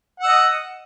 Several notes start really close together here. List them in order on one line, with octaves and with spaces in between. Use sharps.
F#5 E6 D#5